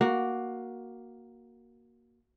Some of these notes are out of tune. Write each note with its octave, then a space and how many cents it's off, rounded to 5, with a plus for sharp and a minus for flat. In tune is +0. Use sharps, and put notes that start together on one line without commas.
A#3 +10 F#4 +0